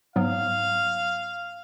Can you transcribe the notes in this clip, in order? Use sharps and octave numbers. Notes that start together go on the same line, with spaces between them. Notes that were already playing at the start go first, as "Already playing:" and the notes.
G#2 F#3 B3 F5